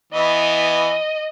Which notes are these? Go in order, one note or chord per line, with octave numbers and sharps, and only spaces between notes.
E3 B3 D#5